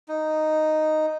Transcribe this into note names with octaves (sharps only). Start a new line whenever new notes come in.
D#4